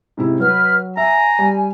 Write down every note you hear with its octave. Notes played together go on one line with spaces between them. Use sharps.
G#2 C3 E4
F#3 B4 F6
E5 G#5 A#5
G3